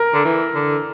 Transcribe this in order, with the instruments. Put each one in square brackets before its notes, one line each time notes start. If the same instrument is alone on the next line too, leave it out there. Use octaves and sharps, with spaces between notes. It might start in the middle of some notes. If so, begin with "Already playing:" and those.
Already playing: [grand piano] A#4
[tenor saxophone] D3
E3
D3